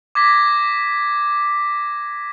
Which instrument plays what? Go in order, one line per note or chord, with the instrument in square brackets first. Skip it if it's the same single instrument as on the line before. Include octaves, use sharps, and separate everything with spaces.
[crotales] D6 G#6 A#6 B6